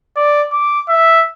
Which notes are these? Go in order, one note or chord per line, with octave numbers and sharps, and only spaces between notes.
D5
D6
E5